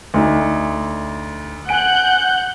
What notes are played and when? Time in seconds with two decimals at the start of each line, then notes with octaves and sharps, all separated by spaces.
0.14 D2 D#4
1.69 F#5 G#5 F#6 G6 D7